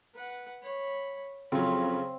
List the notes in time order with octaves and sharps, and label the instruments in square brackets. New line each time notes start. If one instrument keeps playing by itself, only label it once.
[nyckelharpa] B4 F#5
C#5 B5
[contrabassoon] F2 [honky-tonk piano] C#3 F#3 [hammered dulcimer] C4 [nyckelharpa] C#5 B5